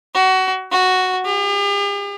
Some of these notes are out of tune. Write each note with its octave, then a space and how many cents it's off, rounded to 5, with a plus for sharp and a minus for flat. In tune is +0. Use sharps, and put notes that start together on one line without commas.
F#4 +25
F#4 +0
G4 +45